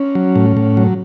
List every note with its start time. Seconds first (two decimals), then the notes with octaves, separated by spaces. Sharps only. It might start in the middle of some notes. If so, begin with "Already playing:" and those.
Already playing: C#4
0.15 F#3
0.36 A2
0.57 A2
0.77 F#3